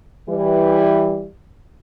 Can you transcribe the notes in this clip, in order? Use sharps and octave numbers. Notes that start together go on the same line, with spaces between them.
E3 G3